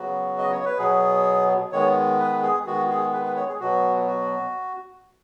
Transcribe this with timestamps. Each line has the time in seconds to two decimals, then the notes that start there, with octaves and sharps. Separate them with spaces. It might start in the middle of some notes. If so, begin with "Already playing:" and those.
Already playing: C#3 F#3 B3 F#4
0.38 D#5
0.52 C#5
0.65 B4
0.78 B2 F#3 B3 G#4
1.72 D#3 G#3 B3 C#5
2.19 B4
2.43 G#4
2.66 D#3 G#3 B3 F#4
2.90 G#4
3.13 B4
3.25 B4
3.36 C#5
3.48 G#4
3.60 B2 F#3 B3 F#4
4.07 F#4